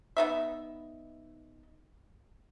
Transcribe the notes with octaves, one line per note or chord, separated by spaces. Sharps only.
B3 D#4 E5